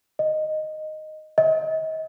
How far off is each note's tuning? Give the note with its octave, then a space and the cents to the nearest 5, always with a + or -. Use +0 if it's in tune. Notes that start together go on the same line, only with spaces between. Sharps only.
D#5 -5
D#5 +35